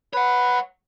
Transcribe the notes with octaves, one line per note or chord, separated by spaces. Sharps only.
B4 C#5 F#5